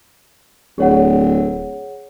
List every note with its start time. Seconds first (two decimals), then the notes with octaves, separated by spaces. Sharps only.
0.78 D1 G#4 C#5 F#5